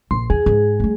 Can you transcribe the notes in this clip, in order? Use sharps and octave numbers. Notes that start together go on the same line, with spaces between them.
A#1 C6
E2 E3 G#4
G#2
G3 A3